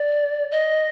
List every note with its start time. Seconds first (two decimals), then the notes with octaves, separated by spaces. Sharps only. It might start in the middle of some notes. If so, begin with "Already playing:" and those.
Already playing: D5
0.51 D#5